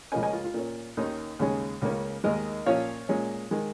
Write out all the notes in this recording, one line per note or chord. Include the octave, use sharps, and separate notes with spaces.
C#2 C#3 F3 A#3 C#4 D#5 G#5
D#5 G#5
F4
F4
A#2 A#3 C#4
D#2 D#3 C#4 D#4
D#2 C#3 G#3 C#4
C#2 C#3 A#3 C#4
D#2 D#3 G#3 A#4 D#5
A#2 F3 C#4 C#5 F5
A#2 G#3 C#4
D#3 G#3